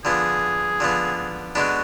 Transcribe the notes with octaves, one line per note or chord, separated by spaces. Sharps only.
D3 F3 B3 G#4
D3 F3 B3
D3 G#3 B3 D4 F#4